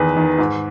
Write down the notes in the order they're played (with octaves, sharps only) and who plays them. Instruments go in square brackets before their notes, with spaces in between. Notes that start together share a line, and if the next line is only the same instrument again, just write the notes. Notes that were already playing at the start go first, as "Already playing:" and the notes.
Already playing: [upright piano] E2 D#3 B4
D#3
G#2